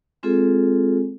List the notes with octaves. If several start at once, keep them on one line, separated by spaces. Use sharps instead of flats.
G#3 C4 F4 G#4 A4